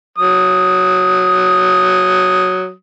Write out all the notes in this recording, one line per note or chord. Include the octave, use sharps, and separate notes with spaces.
F#3 D#6